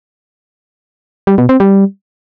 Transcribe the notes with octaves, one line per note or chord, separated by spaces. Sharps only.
G3
B2
C4
G3